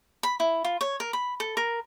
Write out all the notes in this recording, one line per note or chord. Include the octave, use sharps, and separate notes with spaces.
B5
E4
F4
C#5
A#4
B5
A4
A#4